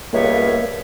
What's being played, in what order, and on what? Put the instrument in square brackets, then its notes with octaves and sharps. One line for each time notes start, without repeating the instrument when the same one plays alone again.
[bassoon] C#2 [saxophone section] G3 B3 C#5 [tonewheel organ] A#3 [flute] E5